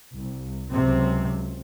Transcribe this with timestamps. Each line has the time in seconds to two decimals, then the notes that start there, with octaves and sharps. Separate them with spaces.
0.15 C2
0.71 C#2 C3 F#3 C4